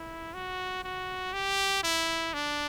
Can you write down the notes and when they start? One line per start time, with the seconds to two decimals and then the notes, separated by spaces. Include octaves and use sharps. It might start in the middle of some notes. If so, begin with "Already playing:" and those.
Already playing: E4
0.34 F#4
0.84 F#4
1.33 G4
1.83 E4
2.34 D4